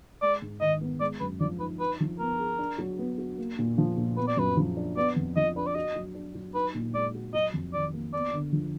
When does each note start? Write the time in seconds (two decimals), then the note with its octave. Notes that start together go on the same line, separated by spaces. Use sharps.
0.22 G#3 D5
0.42 G#2
0.61 D#3 D#5
0.81 B3
1.01 G#3 D5
1.20 F#2 B4
1.40 F3 D5
1.60 D#4 B4
1.80 D#4 B4
2.00 F3
2.19 B3 A#4
2.39 G#4
2.59 D4
2.78 F#3
2.99 B3
3.18 F#4
3.38 A#3
3.59 A#2
3.78 F3
3.97 A#2
4.17 B3 B4
4.28 D5
4.37 F#2 B4
4.57 F3
4.77 D4
4.97 B3 D5
5.16 F2
5.36 F3 D#5
5.56 D4 B4
5.67 D5
5.75 F#4 D#5
5.95 F#3
6.15 D4
6.35 F#3
6.55 D#4 B4
6.74 A#2
6.94 G#3 D5
7.15 F#4
7.34 F#3 D#5
7.54 F2
7.74 D#3 D5
7.94 A#3
8.13 B3 D5
8.33 D3
8.53 F3